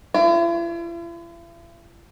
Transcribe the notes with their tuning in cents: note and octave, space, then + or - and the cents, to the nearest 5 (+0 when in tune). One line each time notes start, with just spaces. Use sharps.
E4 +45